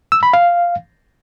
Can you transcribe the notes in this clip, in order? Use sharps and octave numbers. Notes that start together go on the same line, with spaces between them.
E6
B5
F5